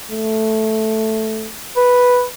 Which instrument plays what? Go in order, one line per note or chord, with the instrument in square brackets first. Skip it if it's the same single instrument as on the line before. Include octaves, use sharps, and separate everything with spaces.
[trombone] A3
[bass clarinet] B4